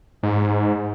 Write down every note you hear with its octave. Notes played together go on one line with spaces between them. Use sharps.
G#2